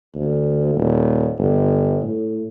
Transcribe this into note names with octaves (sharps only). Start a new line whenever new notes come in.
D2
D#1
G1
A2